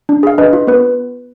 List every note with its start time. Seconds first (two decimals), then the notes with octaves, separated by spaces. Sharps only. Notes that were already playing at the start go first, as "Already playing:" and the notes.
0.09 D4
0.23 G#4 F5
0.38 D4 B4 D#5
0.53 F4
0.67 B3 B4